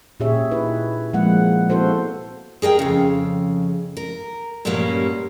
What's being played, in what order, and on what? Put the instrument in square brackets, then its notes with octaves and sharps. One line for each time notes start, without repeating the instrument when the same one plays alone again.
[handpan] A#2 C#4 G4 G#4 C#5 E5
D#4 E4 B4
F3 G#3 A#3 C4 F#5
B3 C4 E4 F#4 A4 C5
[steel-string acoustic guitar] G#4 A#4 D#5 G5
F2 C#3
A#4
G2 A#2 F#3 G3 A#3 C#4